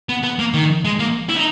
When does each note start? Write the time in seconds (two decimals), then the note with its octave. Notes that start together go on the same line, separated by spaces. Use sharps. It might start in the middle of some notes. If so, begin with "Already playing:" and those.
0.09 B3
0.24 B3
0.39 A#3
0.54 D#3
0.84 G#3
0.99 A#3
1.29 E4
1.37 D#4